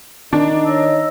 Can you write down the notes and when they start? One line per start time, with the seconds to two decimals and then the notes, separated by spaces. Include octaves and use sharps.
0.33 D#3 D4 D#4
0.65 C#5 D#5 E6